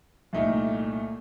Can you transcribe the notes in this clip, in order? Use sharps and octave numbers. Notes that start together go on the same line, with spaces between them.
C2 A#2 A3 D#4